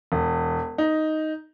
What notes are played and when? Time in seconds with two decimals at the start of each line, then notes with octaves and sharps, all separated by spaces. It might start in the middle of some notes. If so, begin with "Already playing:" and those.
0.12 E1
0.78 D#4